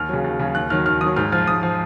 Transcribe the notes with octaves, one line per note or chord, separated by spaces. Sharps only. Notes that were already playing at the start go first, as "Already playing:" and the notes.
Already playing: D#2 F6
C#3 F#3
D#2
C#3 F#3
D#2 F#6
D#3 F#3 F6
D#2 F6
D#3 F#3 D#6
G#2 F6
F3 F6
G#2 D#6
F3